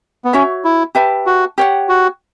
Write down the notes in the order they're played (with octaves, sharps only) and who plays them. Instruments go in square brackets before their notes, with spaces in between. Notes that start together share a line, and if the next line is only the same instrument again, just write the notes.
[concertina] B3
[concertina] C#4 [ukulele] F#4 C#5 E5
[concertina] E4
[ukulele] G4 B4 E5 A5
[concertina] F#4
[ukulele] G4 C#5 F#5
[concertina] F#4